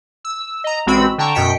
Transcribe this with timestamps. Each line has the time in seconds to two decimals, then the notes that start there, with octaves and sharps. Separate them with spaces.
0.25 E6
0.64 D#5 A#5
0.86 A1 G#3 C4 F#4 B5 E6
1.18 D3 G5 A5 A#5 C#6
1.35 F#2 B2 G5 B6 C#7